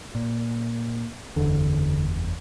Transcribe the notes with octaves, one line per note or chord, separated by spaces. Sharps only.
A#2
F#1 E2 D3